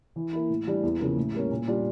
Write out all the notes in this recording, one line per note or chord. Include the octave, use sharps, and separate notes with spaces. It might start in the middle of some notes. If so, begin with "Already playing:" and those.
E3
A#3 E4
A2
E3 G3 D4
E2
C#3 F3 A#3
A2
G3 A#3 C#4
A#2
G3 D4 F4